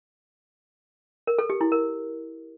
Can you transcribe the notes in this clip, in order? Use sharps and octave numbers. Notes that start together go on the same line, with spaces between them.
A#4
A4
G4
E4
A#4